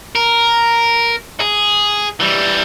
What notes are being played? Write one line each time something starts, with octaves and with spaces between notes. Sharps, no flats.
A#4
G#4
E3 G3